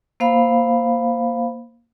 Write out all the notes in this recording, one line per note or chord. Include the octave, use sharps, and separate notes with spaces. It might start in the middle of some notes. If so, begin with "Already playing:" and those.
A#3 C5 F5 B5